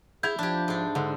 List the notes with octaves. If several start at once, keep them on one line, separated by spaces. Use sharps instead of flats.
E4 G#4 G6 G#6 F7
F3 D4 G4
G#2 D4
G#2 D3